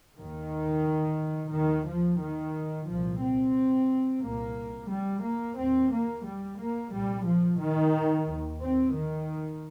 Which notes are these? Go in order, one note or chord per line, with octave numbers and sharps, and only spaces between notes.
D#2 D#3
D#2 D#3
F3
D#3
C2 A#2 F3
C4
C2 A#2 A#3
G3
A#3
D#2 C4
A#3
G3
A#3
C2 A#2 G3
F3
D#3
D#2
C4
D#3